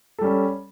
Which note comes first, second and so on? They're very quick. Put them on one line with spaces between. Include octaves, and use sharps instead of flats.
A4 G3 C#4